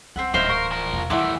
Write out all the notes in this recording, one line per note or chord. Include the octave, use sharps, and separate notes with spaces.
C#2 C4 E5 F#5
D1 A2 E3 D#4 C5 F5
A#4 C#6
F3 A#4
E2 C3
D#3 E3 A3 C#4 E4 F#5 C6 D6